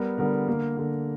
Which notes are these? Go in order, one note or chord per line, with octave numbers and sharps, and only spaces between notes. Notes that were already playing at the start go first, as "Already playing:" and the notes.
Already playing: G3 B3 A#4
D3 G3 B3 A#4
D3 A#3
D3 A#3